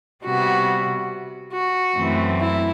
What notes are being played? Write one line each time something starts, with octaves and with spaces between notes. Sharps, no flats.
C3 G3 B3 F#4
F#4
F#2 E3 A3 C4
E4